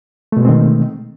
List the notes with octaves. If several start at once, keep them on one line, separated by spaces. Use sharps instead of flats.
B2 D#3 G#3 A3 C4